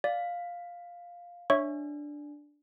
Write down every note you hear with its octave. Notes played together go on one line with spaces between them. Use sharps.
D5 F5
D4 C#5 E5 C#6